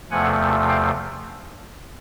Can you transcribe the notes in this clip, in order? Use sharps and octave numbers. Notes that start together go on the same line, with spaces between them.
E2 C3 F3 A3 F#5 G#5
F5 G5